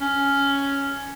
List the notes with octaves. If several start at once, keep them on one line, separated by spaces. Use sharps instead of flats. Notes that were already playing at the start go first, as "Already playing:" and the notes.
C#4